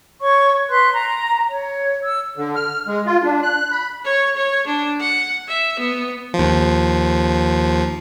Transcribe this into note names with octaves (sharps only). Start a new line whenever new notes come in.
C#5 C#6
B4 C6 F#6
A#5
C#5
E6
D3
F6
G#3
F4
D4
F#6
B5
C#5
C#5
D4
F#5
E5
B3
D#2 F3